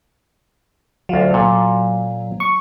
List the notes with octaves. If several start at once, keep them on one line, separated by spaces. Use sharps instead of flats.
D2 F#3 F4
A#2 A4
C#6